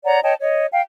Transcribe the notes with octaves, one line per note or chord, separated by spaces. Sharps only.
C#5 D5 F#5 A#5
C#5 D#5 G5 A5
C#5 D#5
F5 G5